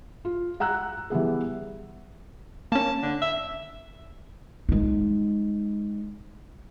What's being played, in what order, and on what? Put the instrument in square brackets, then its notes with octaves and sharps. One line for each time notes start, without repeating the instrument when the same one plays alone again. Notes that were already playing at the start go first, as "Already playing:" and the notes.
[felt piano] F4
F#5 A#5 E6 F#6
E3 G3 B3 G#4
[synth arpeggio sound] A#3 C#4 [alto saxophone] A5
[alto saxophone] D3
E5
[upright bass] G#3 D#4